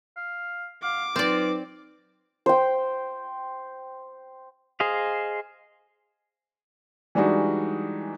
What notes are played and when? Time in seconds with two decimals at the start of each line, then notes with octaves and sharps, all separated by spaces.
0.17 F5
0.83 F5 F#5 D6
1.16 F#3 C4 D#4 F4 B4 D5
2.46 C5 G5
4.80 G#4 C5 D#5 F5
7.15 E3 G3 G#3 D4 D#4 F#4